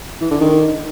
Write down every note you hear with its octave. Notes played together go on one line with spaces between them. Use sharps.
E3
D3
D#3